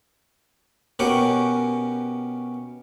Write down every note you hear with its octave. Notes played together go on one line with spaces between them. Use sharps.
B2 C#4 G4 A#4 F#5 G#5